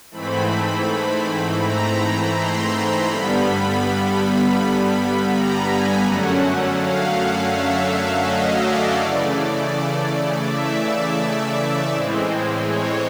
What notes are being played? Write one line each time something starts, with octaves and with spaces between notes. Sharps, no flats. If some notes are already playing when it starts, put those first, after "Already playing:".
G#2 E3 A3 C4 B5
A#5
C6
G2 D3 G3 B3 B5
B5
A#5
G#5
F#2 D3 F#3 A3 C#4 F#5
F5
E5
D#5
D5
C#3 E3 A3
E5
A2 E3 G#3 C4
C#5